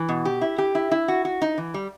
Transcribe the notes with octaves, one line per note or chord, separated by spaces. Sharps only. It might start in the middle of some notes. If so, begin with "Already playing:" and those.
Already playing: E3
B2
G4
E4
G4
E4
E4
F#4
F#4
D#4
E3
G3